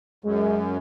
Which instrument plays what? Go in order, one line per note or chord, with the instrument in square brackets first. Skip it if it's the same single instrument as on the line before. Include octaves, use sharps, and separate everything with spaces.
[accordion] F#2 [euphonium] G#3